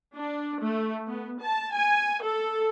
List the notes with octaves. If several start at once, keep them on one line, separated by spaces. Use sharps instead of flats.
D4
A3
B3
A5
G#5
A4